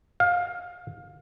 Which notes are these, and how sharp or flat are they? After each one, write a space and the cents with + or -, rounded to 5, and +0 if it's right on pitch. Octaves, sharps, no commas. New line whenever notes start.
F5 +20